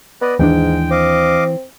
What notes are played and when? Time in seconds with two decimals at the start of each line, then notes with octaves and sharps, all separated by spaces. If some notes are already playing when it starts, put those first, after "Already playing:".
0.21 B3 B4 D5 D#5
0.39 D#2 G#2 E3 G#3 B3 D4 G5
0.91 C4 D#5 F5 D6